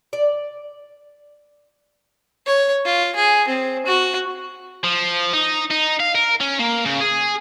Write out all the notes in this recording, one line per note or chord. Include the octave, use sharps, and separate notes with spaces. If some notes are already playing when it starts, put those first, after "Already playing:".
D5
C#5
F4
G#4
C4
F#4
F3
D#4
D#4
F5
A#4
C#4
A#3
C#3
G#4